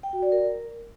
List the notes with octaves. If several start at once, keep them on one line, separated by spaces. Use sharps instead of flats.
G5
F#4
D5
A#4